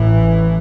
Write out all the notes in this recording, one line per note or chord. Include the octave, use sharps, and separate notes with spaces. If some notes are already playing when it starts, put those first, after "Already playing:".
Already playing: A1 A2 E3